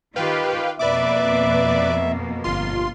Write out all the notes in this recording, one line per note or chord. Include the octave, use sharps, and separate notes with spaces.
D#3 F4 G4 B4 F5 G5
F2 B2 A#3 B4 D5 E5 D6
G1 F4 C6